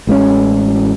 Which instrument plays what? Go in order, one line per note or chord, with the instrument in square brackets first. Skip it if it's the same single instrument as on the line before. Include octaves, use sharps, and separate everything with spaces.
[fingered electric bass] A1 G#3 B3 C#4